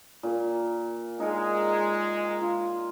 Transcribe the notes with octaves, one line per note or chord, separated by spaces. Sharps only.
A#2
G#3 D#4 A#4
F4